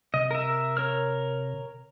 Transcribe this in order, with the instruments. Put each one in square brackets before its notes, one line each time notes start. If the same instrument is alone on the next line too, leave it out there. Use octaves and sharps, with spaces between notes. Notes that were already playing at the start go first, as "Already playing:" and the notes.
[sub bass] C3 [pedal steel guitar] D#5
[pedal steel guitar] A#4 E5
A#4 C#5 F6